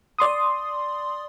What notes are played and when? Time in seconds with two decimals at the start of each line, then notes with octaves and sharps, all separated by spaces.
0.19 D5 C6 D#6